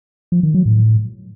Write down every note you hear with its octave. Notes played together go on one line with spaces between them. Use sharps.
F3
D#3
F#3
A2